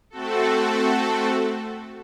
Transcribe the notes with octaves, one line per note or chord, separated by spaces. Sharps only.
A3 C4 F#4 A4